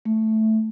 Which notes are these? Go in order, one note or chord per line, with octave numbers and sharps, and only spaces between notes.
A3